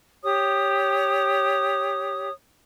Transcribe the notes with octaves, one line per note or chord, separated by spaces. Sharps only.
G4 C#5 D#6